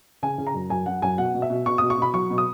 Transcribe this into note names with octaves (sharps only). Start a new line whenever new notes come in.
C#3 G#5
C#3
A#5
F#2
F#2 G#5
F#2 F#5
F#2 G#5
B2 F#5
B2
E5
B2
B2 C#6
B2 D#6
C#6
B2 B5
F#3 C#6
B2
D#6